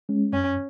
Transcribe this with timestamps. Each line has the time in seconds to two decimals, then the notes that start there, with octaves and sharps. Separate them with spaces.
0.09 G#3 C#4
0.33 F#2 C#4